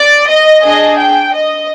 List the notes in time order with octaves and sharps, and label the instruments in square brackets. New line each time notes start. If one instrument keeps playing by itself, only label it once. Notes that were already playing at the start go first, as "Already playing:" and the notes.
Already playing: [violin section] D5
D#5
D4 G#4 D#5
G5
D#5